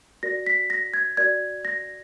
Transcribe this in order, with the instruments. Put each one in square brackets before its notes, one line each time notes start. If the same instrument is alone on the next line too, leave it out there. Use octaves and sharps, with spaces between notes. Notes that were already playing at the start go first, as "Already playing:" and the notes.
[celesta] F#4 A#4 D5 A#6
B6
A#6
G#6
F#4 A#4 D5 G#6
A#6